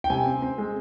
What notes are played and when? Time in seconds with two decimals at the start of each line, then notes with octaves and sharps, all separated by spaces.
0.04 G5
0.10 C3 G#5
0.26 C4
0.42 C4
0.58 G#3